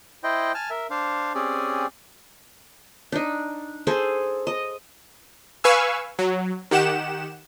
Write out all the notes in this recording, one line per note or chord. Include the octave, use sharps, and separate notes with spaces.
E4 C5 D#5 G5
G#5 A5 F6
A#4 E5
D4 C5 F5
C4 C#4 G4 G#4 D5
D4 D#4
G#4 A4 C5
D#5
B4 F5 G#5 C#6 E6
F#3
D#3 G4 F#5 E7